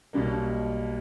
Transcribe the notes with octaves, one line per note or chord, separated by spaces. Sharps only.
B1 B2 G3 A#3